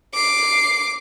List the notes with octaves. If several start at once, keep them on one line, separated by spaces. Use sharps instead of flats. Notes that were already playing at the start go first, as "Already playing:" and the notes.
D6 C7